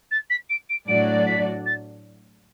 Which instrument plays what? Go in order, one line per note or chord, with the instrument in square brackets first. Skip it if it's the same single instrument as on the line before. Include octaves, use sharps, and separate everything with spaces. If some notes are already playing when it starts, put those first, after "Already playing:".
[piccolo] A6
B6
D7
D7
[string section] A2 F#3 D4 F#4 D5 [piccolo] D7
[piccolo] B6
A6